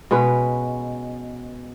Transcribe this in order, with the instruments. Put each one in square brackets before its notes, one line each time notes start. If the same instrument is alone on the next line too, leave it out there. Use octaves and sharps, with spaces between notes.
[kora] B2 G#3 C#4 B4